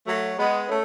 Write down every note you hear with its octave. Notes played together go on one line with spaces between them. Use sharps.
F#3 A3
G#3 B3
A3 C#4